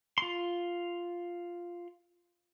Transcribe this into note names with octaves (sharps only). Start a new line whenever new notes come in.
F4 C6